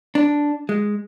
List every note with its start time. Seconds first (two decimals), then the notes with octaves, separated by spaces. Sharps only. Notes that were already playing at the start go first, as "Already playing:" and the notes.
0.15 D4
0.69 G#3